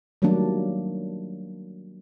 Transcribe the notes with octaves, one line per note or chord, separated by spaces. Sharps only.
D#3 F#3 G3 A3 A#3 D4